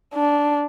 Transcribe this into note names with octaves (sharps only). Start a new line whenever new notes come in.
D4